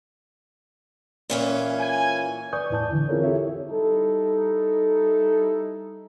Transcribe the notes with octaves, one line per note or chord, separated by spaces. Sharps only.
A#2 E3 C#4
G#5
B4 D5 G#5 C#6 D#6 G6
E2 A2 E4 D5 A5 G6
D3 E3
C4 E4 F4 G#4 A#4 C#5
E4 G4 A4 C#5 E5
G3 D#4 E4 A4